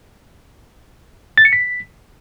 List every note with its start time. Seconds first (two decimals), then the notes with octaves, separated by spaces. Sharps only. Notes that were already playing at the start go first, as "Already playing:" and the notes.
1.38 A6
1.45 C#7
1.53 B6